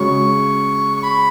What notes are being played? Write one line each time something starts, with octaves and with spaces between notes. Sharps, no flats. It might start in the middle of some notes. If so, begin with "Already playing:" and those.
Already playing: C#3 G#3 C#4 F#4 C#6
C#6
B5